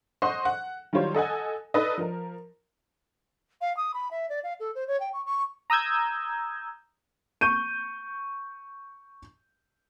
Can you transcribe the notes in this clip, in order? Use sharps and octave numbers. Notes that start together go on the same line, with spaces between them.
C5 D#5 F#5 C6 C#6
F#5
D#3 F#3 G3 F4 C5 C#5
A4 D#5 F#5 G#5
D#4 A4 B4 D5 D#5
F3 A#4
F5
D#6
B5
E5
D5
F5
A4
C5
C#5
G5
C#6
C#6
A#5 D#6 E6 G6 G#6
C#6 G6 D#7